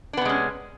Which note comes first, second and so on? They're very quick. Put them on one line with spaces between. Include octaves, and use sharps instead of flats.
D4 B3 C3 G#3 C#4